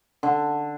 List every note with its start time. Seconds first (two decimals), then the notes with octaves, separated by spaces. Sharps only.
0.23 D3